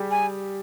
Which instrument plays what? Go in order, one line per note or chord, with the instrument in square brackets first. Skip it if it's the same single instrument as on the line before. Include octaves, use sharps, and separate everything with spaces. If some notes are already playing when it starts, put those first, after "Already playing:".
Already playing: [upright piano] G3 G4 G#4
[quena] G#5